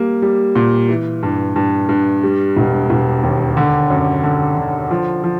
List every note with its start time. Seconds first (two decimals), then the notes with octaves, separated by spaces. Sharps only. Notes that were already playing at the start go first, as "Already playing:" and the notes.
Already playing: G3 A#3
0.22 G3
0.55 A#2
0.89 E3
1.23 G2
1.56 G2
1.89 G2
2.23 G3
2.57 E1
2.90 E1
3.23 D#2
3.57 D3
3.90 F#2
4.24 D3
4.57 D3
4.91 F3
5.24 F3